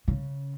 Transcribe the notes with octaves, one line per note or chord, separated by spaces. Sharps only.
C#3